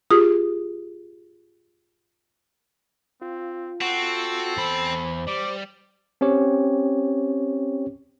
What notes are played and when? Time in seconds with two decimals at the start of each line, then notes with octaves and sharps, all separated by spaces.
0.10 F4 G4 G#4 D#6
3.21 C4 F4
3.81 C4 F#4 A4
4.57 E2 C5 B5
5.27 G3 D6
6.21 C4 C#4 G4 C#5